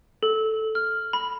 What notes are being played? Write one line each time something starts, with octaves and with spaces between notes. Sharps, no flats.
A4
F6
B5